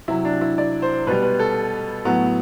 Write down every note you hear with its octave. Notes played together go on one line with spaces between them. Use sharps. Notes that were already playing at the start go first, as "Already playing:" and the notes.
C3 F#3 E4
D4
E4
D5
C5
B2 G3 B4
B4
A4
A2 F#3 B3